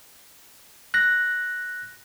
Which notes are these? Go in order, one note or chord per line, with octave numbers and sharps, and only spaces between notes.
F#6 A#6